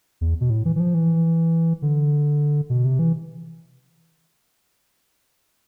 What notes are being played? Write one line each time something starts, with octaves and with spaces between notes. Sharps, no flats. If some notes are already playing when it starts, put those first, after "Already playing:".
E2
B2
A2
E3
E3
F3
E3
D3
B2
C3
E3